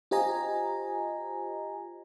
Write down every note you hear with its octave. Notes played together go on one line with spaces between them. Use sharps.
F4 G4 C5 D#5 G#5 A#5